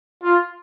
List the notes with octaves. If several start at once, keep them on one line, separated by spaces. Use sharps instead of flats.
F4